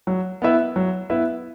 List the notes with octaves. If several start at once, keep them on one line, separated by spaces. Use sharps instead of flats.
F#3
B3 E4 B4 E5
F#3
B3 E4 B4 E5